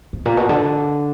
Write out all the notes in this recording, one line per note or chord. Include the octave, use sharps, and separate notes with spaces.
G#2
A#2
B2
D3